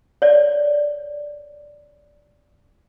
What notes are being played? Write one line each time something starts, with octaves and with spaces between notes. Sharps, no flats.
C#5 D5